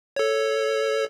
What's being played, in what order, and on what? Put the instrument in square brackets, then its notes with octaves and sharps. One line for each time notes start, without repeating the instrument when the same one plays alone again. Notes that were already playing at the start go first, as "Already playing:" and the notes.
[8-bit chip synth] A4 C#5